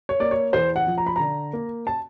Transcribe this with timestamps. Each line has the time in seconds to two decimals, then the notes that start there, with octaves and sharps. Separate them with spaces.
0.09 C#5
0.20 A#3 D5
0.31 C#5
0.53 E2 C5
0.76 F#5
0.87 F3
0.98 A#5
1.06 B5
1.16 D3 A#5
1.53 A#3
1.87 A5